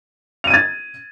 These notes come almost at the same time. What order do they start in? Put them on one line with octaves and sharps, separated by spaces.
F7 D#7 G#6 A6